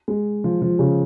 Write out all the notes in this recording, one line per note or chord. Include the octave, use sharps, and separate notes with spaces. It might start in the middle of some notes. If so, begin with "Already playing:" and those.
G#3
F3
F3
C#3